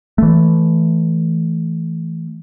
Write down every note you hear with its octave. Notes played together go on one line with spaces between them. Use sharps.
E3 A3